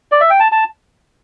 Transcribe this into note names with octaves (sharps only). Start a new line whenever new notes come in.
D5
E5
G5
A5
A5